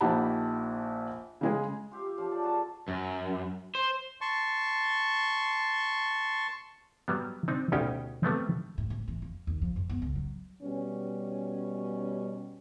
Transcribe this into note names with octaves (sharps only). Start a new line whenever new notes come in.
A#1 D#4 G4 F#5 A5 B5
C#3 G#3 G#4
F4 G4 E5 F5
G4
F3 C#4 F5
G#4 A4 D5
F#4 G#4 A#4 A5
F#2
C5
A5 C6 C#6
F#3 G3 B3
C4 D4 D#4
D2 B2 C#4 D#4 G4 G5
G3 A3 B3 C4
A2
A2
E3
F2
D#2
F3
F#2
B3
C#2
F#3
B2 G3 C#4